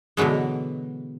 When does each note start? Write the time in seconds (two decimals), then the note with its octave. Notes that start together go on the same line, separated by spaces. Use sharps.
0.17 B2 D3 E3 F#3 G#3